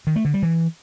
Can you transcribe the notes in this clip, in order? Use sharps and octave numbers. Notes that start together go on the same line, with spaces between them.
D#3
A3
D3
G3
E3